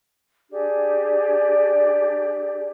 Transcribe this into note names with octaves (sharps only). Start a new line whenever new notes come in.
D4 G4 G#4 D5